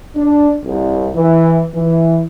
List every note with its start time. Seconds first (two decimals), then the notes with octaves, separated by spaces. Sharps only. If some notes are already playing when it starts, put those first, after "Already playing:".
0.16 D4
0.65 C2
1.15 E3
1.75 E3